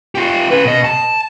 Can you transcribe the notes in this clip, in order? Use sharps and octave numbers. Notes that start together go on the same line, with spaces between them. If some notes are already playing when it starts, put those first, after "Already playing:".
F4 G4
C#4 B4
B2 D#5
A5